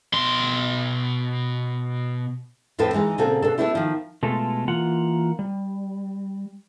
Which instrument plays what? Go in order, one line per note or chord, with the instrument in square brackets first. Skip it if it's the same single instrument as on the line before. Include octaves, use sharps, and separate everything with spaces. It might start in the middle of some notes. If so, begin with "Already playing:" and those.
[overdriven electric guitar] B2 C6
[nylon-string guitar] F2 A2 C4 A4 B4 G5
E3 G#3 D#4
A#2 C#3 C4 F#4 G4 A4
B2 D4 A4
A3 B3 D4 E4 G4
D#3 F3
[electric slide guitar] B2 G#3 A3 F4 A4
E3 A#3 F4 F#5
G3